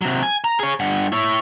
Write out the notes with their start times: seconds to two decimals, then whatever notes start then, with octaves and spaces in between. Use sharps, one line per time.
0.02 C3 F#3
0.23 G#5
0.44 A#5
0.59 G#4 C#5
0.80 G2 F#5
1.12 E4 C#5